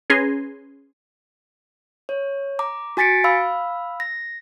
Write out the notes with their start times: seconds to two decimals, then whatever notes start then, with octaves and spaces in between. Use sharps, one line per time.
0.10 C#4 G#4 B4 G#5 A#5 C6
2.09 C#5
2.59 A#5 D6
2.97 F#4 G#5 A6 B6 C#7 D7
3.24 F5 B5 E6
4.00 A#6